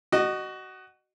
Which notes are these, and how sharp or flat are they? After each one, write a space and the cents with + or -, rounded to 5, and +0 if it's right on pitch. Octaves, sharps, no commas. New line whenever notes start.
F#4 +20 D#5 -25